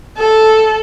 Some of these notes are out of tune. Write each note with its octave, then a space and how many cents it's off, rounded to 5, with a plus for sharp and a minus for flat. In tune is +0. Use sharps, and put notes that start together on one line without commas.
A4 -5